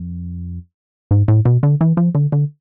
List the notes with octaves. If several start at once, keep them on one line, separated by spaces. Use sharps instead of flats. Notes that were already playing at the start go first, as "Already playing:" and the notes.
Already playing: F2
G#2
A2
B2
D3
E3
F3
D3
D3